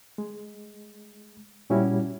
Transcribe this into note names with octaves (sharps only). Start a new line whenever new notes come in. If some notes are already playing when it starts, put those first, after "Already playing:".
G#3
A#2 G3 C#4 E4 F#4